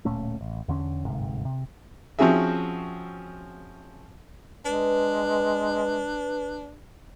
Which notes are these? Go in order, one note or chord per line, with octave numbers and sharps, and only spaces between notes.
D1 A#2 A3 C#4
A1
E2 D3 C#4
D1 G1 G#2 C3
C3
F3 C4 C#4 F#4 G#4 E5
G#3 D4 B4